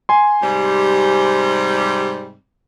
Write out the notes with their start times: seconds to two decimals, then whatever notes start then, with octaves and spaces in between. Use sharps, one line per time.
0.09 G#5 C6
0.41 G#2 C3 G3